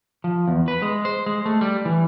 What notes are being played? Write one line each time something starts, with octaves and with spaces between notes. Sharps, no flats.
F3
E2
B4
G#3
C5
G#3
A3
G3
E3